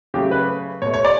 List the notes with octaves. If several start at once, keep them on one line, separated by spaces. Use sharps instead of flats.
C#3 F#3 A3 G4
B4
B2 A3 C#5
C#5
D5